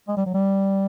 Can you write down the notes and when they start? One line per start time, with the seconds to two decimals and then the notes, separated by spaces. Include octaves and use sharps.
0.08 G#3
0.17 G3
0.26 F#3
0.34 G3